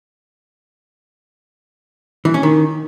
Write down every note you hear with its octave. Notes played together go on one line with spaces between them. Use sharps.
E3
C#4
D#3